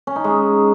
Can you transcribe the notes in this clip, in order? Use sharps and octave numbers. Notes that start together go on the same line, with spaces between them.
C#4
D#4
G#3